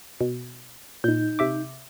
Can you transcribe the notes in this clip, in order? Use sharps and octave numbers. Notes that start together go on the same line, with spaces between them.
B2
A#2 D#4 G6
C3 E5 D6